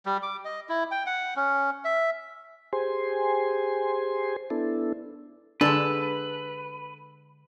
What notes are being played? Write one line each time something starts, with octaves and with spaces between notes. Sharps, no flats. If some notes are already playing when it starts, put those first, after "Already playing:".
G3
D6
D#5
E4
G5
F#5
C#4
E5
G4 G#4 C5 G#5 C6
B3 D4 E4 A4
D3 G#3 D4 A4 B4